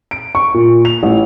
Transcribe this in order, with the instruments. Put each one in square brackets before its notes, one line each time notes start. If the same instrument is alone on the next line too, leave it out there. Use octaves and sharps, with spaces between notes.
[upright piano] D7
C#6
A#2
F7
A1